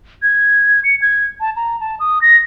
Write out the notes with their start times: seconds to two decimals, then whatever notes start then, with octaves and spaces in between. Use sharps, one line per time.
0.23 G#6
0.84 C#7
1.02 G#6
1.41 A5
1.56 A#5
1.80 A5
2.00 D#6
2.22 A#6